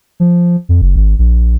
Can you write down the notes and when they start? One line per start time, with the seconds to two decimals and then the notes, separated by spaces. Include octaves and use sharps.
0.20 F3
0.69 F2
0.81 F#1
0.96 G#1
1.19 A#1